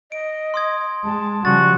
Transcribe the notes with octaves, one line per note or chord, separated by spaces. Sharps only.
D#5 D7
C6 D#6 G#6
G#3 A5
C#3 F3 G3 F#4 A6